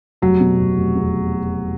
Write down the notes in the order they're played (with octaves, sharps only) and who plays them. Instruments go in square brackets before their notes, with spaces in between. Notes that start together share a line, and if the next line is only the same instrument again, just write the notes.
[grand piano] F1 [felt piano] F#3
[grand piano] B2
F1
F1
E2